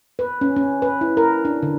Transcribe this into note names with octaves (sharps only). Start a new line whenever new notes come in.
B4
C#4
C#4
B4
E4
A#4
D4
D3